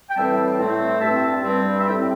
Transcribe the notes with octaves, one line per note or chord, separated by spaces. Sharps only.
G5
A2 E3 G3 C4 E5 A5
A2 A3 C4
G2 G3 C4 E5 A5
G2 G3 C4
E5
A2 G3 C4 D5 G5